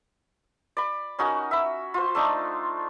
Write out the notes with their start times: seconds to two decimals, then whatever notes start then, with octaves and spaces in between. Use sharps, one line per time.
0.77 D5 B5
1.19 C#4 D#4 F#4 A#4
1.51 E5 B5
1.94 F4 C5
2.15 A3 D4 D#4